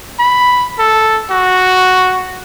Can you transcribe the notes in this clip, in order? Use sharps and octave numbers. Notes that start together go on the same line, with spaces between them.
B5
A4
F#4